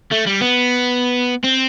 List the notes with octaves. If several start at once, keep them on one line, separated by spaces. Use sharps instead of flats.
A3
G3
B3
C4